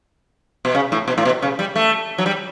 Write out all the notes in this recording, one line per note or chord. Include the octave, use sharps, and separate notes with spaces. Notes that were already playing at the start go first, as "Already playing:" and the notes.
B2
C#3
A2
B2
A2
B2
C#3
G3
A3
F#3
G3